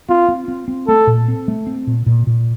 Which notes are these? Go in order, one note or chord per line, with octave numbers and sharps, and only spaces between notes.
C4 F4
C4
C4
C4
A3 A4
A#2
C4
A3
C4
A#2
A#2
A#2